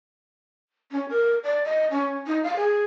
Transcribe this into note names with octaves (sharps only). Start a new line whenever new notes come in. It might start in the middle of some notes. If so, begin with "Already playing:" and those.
C#4
A#4
D5
D#5
C#4
D#4
F5
G#4